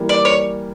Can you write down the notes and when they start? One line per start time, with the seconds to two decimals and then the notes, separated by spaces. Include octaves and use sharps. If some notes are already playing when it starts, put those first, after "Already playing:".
Already playing: E3 G3 A#3
0.09 D5
0.25 C#5